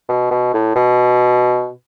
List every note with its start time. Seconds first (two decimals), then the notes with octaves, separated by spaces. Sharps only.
0.09 B2
0.31 B2
0.54 A2
0.76 B2